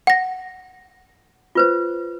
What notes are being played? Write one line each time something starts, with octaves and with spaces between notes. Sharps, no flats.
F#5 A#6
F4 B4 C5